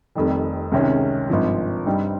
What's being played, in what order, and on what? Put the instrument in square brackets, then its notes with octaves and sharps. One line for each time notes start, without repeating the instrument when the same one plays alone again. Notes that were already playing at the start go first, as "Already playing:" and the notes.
[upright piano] F1 F2 D#3 G3
C#2 C3 D#3 G#3 C#4
G#1 G2 F3
G2 G3 C4 D#4